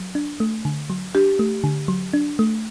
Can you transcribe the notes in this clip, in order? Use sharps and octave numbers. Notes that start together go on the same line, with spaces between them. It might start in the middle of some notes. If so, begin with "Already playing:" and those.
Already playing: F#3
D4
A3
D3
F#3
D4 G4
A3
D3
F#3
D4
A3